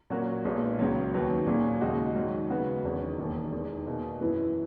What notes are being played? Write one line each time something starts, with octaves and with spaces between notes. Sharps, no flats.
A#2 F#3 C#4 F#4 A#4
B1 A#2 G#3 B3 D#4
C#2 C#3 F#3
D#2 D#3 F#3 B3
A#2 F#3 A#3 C#4 G#4
D#2 C#3 G#3 D#4 F#4
G#2 D#3 F#3
C#3 G#3 B3 F#4
E1 E2 D#3 F#3 C#4
E1 D#2 D#3
E2 D#3 G#3 D#4 A#4
B2 A#3 D#4 G#4
F#2 E3 B3 E4 B4